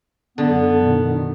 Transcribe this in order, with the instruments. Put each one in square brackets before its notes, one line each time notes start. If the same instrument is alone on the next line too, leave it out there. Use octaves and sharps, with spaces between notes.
[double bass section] F#2 [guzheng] D3 [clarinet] B3
[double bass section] B2 D#3